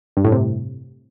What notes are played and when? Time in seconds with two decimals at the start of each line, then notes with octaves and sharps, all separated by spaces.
0.17 G2
0.24 A2
0.32 C3